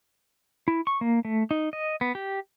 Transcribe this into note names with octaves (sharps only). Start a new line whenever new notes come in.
E4
C#6
A#3
A3
D#4
D#5
B3
G4